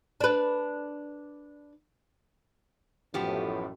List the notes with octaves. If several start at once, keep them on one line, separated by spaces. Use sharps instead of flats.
D4 B4
A1 F#2 A2 F3 B3 G4